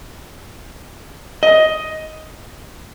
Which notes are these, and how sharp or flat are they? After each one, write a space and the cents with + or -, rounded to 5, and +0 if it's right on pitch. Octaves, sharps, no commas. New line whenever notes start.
D#5 +10